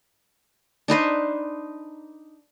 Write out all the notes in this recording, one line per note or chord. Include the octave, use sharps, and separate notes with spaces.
D4 D#4 B4 C5